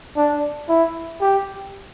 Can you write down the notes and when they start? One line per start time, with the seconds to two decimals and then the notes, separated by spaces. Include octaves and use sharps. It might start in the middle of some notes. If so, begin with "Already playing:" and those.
0.16 D4
0.69 E4
1.21 G4